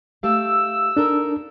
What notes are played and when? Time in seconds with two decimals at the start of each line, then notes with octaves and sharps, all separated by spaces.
0.23 A3 G4 F5 E6
0.97 D4 D#4 A4 A#4